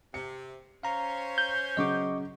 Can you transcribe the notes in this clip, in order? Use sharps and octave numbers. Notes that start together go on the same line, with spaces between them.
C3 C#7
C#4 C5 C#5 F5 A#5
G6
C#3 F#3 D#5 C#6 D6